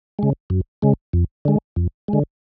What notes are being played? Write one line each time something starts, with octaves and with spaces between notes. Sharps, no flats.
C#3 G#3
F#2
C#3 G#3
F2
D3 G#3
F2
D3 G#3